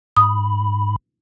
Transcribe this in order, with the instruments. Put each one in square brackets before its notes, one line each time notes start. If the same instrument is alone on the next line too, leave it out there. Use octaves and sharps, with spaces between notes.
[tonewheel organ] G#2 B5 [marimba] D#6